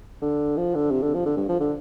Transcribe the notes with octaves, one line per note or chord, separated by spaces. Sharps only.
D3
F3
D3
C3
D3
F3
D3
G2
F3
D3